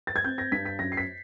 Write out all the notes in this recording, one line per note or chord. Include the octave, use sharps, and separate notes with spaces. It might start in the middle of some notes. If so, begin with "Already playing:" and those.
A6
G#6
C4 G6
A#6
G2 B6
B6
F#2 A#6
C7
B6